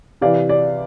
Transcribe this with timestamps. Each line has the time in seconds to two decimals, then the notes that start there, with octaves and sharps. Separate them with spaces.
0.21 C3 E3 D5 F5
0.49 D5